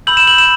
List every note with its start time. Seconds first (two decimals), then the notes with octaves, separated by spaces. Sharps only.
0.07 B5 E6 G6 F#7
0.17 E7
0.27 F#7
0.38 E7